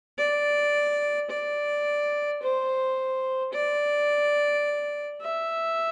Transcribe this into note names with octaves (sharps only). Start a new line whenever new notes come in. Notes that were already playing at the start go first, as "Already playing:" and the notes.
D5
D5
C5
D5
E5